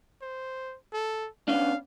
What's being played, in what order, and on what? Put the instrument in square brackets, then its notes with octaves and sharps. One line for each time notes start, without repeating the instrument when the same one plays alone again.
[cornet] C5
A4
[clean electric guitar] B3 C#4 D4 [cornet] F5